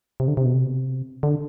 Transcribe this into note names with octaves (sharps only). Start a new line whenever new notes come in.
C3
D3
C3
B2
C3
D3